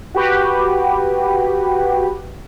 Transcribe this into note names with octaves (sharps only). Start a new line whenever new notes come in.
F#4 G4 B4